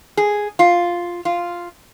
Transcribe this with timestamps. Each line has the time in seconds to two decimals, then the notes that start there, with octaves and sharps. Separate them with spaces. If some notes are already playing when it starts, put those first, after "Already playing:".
0.17 G#4
0.59 F4
1.25 F4